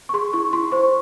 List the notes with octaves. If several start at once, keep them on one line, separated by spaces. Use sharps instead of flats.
C#6
G#4 C6
E4 C#6
E4 C6
C5 C#6